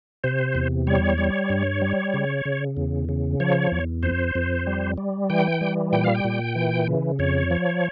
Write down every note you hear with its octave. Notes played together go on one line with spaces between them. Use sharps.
C3 C5
E2
G3 C#5
G3
G2
G3
C#3
C#3
E2
C#3
F3 C#5
E2
F2 C5
F2
G3
G3
E3 G5
G3
A#2 G5
F5
G5
A#2
E3
C#3
F2 C#5
F3